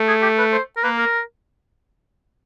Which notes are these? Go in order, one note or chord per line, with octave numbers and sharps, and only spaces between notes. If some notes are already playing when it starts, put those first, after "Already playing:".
Already playing: A3
G#4
G4
B4
C5
A#4
A#3 B4
A#4